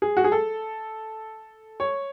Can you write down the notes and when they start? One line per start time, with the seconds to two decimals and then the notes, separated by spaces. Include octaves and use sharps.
0.02 G#4
0.17 F#4
0.24 G#4
0.32 A4
1.80 C#5